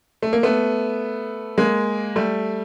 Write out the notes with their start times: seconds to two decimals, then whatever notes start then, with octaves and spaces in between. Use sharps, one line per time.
0.22 A3
0.33 A#3
0.43 A3 B3
1.58 G#3 A#3
2.16 G3 A3